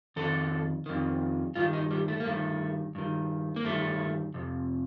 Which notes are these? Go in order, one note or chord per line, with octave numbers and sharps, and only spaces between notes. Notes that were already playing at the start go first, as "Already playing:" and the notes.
F2 D#3 A4
F2 D#3
G2 D#3 F4
D#4
G3
A3
A#3
G2 D#3 A3
G2 D#3
A#3
G2 D#3 A3
F2 C3